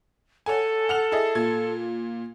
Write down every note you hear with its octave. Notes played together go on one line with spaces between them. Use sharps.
A4 C#5 F#5 G#5
F#5 F6 F7
E4 G#4 D#5
A#2 G#6